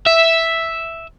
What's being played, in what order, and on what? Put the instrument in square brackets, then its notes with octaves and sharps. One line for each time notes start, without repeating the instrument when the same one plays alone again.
[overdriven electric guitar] E5